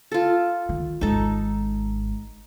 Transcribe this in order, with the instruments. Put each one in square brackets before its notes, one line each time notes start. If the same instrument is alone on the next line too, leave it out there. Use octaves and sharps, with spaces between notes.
[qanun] F4 A4
[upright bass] D#3
[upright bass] G#1 G#3 [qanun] D#4 A4